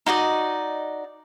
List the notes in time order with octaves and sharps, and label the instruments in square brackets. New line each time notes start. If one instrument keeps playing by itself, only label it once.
[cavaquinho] D#4 F#4 D5 D#5